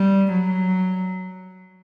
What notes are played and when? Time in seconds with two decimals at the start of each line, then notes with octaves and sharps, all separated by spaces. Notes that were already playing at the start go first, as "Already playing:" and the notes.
Already playing: G3
0.32 F#3